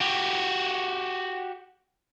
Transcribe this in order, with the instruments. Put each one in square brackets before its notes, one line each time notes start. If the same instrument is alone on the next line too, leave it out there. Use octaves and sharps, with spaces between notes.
[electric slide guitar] F#4 G4